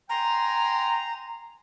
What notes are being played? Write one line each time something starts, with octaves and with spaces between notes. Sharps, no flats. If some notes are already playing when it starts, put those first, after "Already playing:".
G5 G#5 A#5 C6